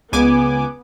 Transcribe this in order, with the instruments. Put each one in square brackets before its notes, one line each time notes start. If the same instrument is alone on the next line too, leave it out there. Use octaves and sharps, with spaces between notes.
[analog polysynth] C#2 G#5 D6 [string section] B3